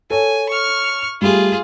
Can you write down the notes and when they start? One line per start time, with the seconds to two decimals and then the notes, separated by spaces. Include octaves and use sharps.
0.10 A4 C#5 G#5
0.49 C#6 F6
1.22 G3 A3 F4 G4 G#4